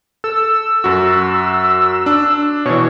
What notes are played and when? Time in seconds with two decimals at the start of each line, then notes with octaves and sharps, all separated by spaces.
0.24 A4 E6
0.84 F#2 F#4
2.06 D4
2.65 B2 E3 C#5